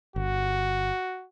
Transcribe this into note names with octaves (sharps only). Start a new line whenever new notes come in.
G1 F#4